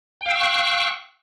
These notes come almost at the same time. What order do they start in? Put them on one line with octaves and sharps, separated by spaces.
G5 F5 E6 C#6 F#6